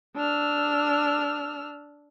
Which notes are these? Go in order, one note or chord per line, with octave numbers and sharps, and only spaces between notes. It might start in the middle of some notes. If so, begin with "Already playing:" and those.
D4 E6 F6